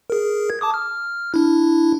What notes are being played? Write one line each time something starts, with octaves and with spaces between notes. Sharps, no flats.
G#4 A#4
G#6
A5 D6 D#6
F6
D4 E4